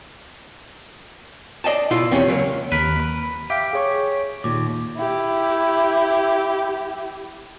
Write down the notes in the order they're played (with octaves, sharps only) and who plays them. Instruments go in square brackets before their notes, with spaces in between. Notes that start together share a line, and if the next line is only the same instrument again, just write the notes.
[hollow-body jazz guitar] D5 D#5 G#5 A5
B2 E4 F4
E2 C3 C4 C#4
C#2 F#3 A3 A#3
[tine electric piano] D#2 [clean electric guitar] A#4 B4
[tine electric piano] B5
[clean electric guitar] G4 [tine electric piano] E5 F5
[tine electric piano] G#4 C#5 C#6
[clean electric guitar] D#2 [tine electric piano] A#2 D6
[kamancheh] E4 G4